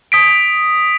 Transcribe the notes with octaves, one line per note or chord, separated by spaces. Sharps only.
D#6 B6 D7